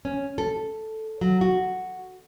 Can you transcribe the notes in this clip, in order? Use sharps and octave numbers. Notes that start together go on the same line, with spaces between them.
C#4
A4
F#3
F#4